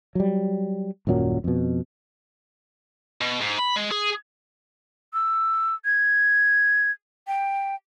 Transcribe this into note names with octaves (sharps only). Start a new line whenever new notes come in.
F#3 G3
D#1 F#2 A#2 F#3
F2 B2
B2
G#2
B5
G#3
G#4
E6
G#6
G5